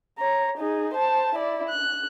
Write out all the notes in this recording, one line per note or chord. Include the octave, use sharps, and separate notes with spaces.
C#5 A#5
D#4 G#4
C5 A5
E4 D5
F#6